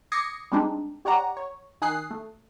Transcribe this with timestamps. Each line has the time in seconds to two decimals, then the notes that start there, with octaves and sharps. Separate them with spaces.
0.12 D6 D#6 G#6 A#6 C7 C#7
0.52 G3 G#3 C4 D4 D#4
1.05 G4 C#5 D5 F#5 A#5
1.37 C#5
1.82 D#3 G#5 D#6 F#6 C7
2.11 A3